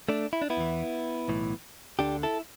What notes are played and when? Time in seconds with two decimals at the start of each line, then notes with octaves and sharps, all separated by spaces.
0.09 A3 D4
0.33 E4
0.42 D4
0.50 B3 E4
0.57 E2 E3
1.28 B1 A2 E3
1.99 D2 D3 D4 G4
2.23 E4 A4